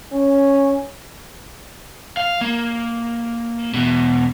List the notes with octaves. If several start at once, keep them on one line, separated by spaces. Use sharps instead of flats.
C#4
F5
A#3
E2 B2